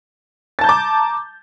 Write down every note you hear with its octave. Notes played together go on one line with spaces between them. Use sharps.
A5 A#5 D6 G6 A6